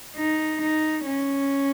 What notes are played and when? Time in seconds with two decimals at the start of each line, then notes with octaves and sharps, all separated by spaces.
0.16 D#4
0.61 D#4
1.06 C#4